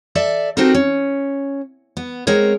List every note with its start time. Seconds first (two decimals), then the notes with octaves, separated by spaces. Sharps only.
0.15 A4 D5 E5
0.57 C4 D#4 F#4 G4 A4 A#4
0.74 C#4
1.97 B3
2.27 G#3 C4 A#4 C#5